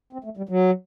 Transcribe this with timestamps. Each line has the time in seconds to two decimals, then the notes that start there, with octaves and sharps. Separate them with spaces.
0.13 C4
0.24 A3
0.37 G3
0.49 F#3